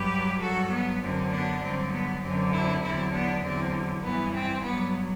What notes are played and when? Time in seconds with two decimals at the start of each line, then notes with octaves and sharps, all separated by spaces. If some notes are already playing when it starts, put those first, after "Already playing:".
Already playing: G2 F#3 G4 B4
0.41 G2 F#3 F#4 A4
0.71 B3
1.01 F#2 D3 F#3 C4
1.31 B3 D4
1.62 G2 D3 F#3 C4
1.92 B3
2.22 F#2 D3 F#3 C4
2.52 C4 E4
2.82 E2 D3 F#3 C4 E4
3.13 B3 D4
3.43 E2 D3 F#3 C4
4.03 G2 E3 B3
4.34 C4
4.63 G2 F#3 B3